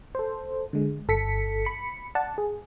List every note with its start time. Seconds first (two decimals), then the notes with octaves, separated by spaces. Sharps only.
0.15 A4 C5
0.73 D3 G#3
1.08 G1 A4 B6 C#7
1.65 B5 C#7
2.15 D5 F#5 A5
2.38 G#4